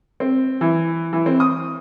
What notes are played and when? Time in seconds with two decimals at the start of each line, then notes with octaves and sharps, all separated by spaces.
0.20 C4
0.61 E3
1.13 E3
1.26 C4
1.40 D#6